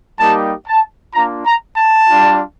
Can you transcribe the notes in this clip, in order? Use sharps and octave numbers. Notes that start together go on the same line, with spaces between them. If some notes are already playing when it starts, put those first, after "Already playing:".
G3 A#3 D#4 G4 A5
A5
A#3 D4 F4 A#5
A#5
A5
G3 D4 F4